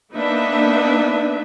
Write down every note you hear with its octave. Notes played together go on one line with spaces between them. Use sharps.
A#3 B3 D4 D#4 B4 E5